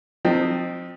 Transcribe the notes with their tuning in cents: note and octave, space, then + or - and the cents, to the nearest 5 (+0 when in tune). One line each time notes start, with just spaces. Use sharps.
F3 +25 C4 +0 D#4 -20